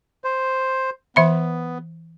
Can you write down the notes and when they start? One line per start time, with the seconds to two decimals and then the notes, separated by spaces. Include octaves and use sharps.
0.24 C5
1.16 E3 B3 E5 B5